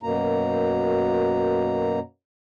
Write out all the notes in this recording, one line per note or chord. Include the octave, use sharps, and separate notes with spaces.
F#2 B2 A#3 A#5